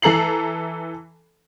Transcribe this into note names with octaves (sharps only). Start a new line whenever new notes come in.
E3 A4 A#5 C7 F#7